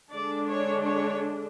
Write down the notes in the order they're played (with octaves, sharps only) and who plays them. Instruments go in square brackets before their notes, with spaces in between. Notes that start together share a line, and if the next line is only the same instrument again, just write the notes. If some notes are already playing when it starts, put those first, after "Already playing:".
[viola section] D3 G#3 D4 D5
C#5
C#5